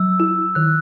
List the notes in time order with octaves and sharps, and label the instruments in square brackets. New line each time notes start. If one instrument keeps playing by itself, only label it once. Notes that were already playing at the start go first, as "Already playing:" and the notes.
Already playing: [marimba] F#3 [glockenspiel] E6
[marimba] E4
[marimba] D#3 [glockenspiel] F#6